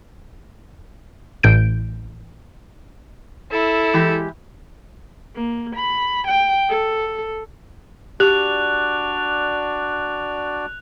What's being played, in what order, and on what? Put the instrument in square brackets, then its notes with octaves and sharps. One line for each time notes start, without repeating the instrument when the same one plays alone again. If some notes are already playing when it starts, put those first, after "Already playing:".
[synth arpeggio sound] A1 A2 G6 D7
[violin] E4 [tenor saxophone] A4
[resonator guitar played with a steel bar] E3 G#3 G4
[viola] A#3
B5
G5
A4
[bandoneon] D4 F#4 D5 [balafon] G4 [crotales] F#6 F7